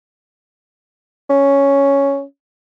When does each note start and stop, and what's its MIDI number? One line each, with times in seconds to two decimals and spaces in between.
1.30 2.22 61